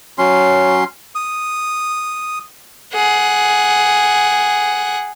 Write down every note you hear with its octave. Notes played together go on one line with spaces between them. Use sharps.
F#3 C#4 C6
D#6
G#4 F#5